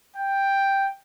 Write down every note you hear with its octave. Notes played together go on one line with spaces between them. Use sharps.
G5